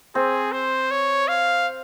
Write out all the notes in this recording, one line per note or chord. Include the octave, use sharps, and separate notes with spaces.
C4 G#4
C5
C#5
F5